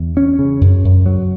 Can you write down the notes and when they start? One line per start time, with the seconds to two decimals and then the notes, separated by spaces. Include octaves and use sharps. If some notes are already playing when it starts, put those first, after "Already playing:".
Already playing: E2
0.17 C#4
0.39 C#3
0.61 F#2
0.84 F#2
1.06 F#3